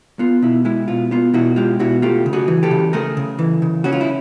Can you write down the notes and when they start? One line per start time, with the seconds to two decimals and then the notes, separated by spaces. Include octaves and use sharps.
0.19 B3 F4
0.42 B2 E4
0.65 G#3 E4
0.88 B2 F4
1.11 B3 F4
1.34 B2 E4 F#4
1.56 G#3 F4 G4
1.79 B2 E4 F#4
2.02 A3 F4 G4
2.26 C#3
2.33 F#4 G#4
2.48 E3
2.63 G4 A4
2.71 C#3
2.93 A3 G#4 A#4
3.17 C#3
3.39 E3
3.62 C#3
3.84 C#4 F#4
3.93 F4
4.01 E4